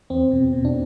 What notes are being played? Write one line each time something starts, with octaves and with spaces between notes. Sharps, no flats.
E2 C4
B2
B2
D4